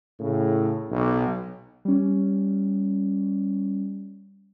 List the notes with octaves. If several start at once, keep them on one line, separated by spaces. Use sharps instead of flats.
A2 C#3
B1
G3 C#4